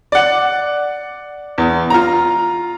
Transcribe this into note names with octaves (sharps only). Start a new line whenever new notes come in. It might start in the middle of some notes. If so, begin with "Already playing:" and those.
D5 F#5
E2
F4 A#5